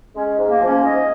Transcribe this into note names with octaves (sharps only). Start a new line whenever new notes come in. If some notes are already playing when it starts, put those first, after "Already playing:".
G#3 C#4
G#2
A#3
F3
C#4
G#2 D#5